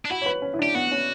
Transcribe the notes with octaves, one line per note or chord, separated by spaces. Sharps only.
D4
E4 F#4
C#5
B4
C#4
E4
D4
G4
B3 F#4
C#4